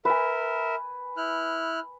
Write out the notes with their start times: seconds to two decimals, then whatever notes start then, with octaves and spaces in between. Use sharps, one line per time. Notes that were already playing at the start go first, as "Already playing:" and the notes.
0.05 A#4 B4 E5 G#5
1.17 E4 F6 F#6